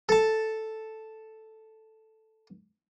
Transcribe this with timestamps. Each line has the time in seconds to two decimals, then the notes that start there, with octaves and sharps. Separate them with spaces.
0.09 A4 A5